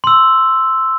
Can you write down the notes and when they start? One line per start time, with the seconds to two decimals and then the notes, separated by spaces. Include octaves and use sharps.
0.04 C6 E6